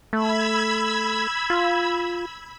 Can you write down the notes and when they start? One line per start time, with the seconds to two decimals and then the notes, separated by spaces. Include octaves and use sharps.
0.13 A3 B5 E6 G#6
1.50 F4